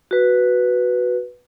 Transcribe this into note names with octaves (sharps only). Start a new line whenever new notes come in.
F#4 B4